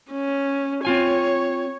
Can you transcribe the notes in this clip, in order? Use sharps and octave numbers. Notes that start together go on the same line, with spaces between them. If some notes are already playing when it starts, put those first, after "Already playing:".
C#4
C4 F4 C#5 G#5